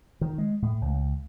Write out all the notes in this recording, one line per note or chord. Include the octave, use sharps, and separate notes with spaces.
D#3
G#3
A2
C#2